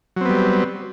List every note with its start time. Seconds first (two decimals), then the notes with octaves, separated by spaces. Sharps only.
0.16 F#3
0.21 C4
0.25 B3
0.30 G3